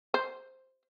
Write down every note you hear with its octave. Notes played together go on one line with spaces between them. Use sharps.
C5